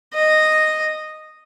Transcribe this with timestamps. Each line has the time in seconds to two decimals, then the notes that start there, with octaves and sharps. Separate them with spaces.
0.14 D#5